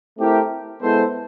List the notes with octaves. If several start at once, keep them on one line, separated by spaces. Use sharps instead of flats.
A3 C4 E4 G4 A#4
G#3 B3 E4 A4 C5